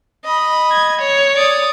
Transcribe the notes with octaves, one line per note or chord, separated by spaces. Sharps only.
D#5 B5
G#6
C#5
D5 D#6